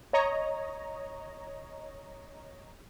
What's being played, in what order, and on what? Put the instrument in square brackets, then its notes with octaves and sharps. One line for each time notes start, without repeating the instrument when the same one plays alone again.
[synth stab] C#5 D#5 A#5